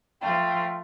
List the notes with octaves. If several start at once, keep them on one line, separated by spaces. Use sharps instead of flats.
F3 A3 F4 G5